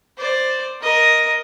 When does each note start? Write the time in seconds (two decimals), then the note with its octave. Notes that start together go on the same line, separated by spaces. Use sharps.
0.18 C5 D5
0.82 A#4 D#5